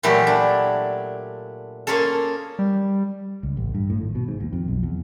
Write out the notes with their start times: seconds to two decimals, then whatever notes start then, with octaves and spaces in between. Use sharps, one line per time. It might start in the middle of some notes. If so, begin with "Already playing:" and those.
0.03 A#2 E3 F#3 A3 E4 G4
0.27 D4
1.87 A#3 C#4 F4 G#4 A4
2.59 G3
3.43 C#2
3.57 A1
3.74 G2
3.90 A2
4.01 G#1
4.15 B2
4.28 G#2
4.40 D#2
4.53 F2
4.68 B1
4.83 E2